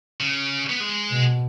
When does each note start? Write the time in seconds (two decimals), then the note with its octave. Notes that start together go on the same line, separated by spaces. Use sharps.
0.20 C#3
0.69 B3
0.80 G#3
1.11 B2